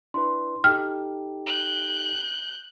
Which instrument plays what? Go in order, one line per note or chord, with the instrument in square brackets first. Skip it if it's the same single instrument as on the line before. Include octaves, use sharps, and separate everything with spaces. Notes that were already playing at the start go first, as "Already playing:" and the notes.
[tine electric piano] D4 E4 B4 [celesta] C6
[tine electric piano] D#4 G4 A4 [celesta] G5 [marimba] F6
[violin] F#6 G6